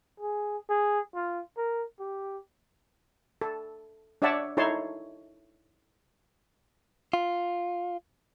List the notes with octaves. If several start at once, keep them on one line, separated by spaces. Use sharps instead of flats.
G#4
G#4
F4
A#4
G4
A4
D4 C#5 D5 E5 F#5 A5
D#4 E4 A4 C#5 A5 C6
F4